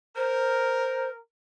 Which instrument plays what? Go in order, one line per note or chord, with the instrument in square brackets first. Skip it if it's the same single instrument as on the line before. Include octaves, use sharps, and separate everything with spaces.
[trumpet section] A#4 [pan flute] C5